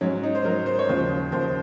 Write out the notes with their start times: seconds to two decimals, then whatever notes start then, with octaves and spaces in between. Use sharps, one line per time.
0.01 G#2 F#3 C#4
0.23 D#4
0.35 C5
0.45 G#2 F#3 A#4
0.66 C5
0.79 C#5
0.89 D#2 C#3 F3 C5
1.32 D#2 C#3 F3 C5